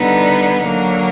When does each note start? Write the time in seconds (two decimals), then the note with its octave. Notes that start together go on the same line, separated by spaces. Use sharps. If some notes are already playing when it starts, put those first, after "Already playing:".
Already playing: D3 G3 B3 D#4
0.66 D3 F#3 A#3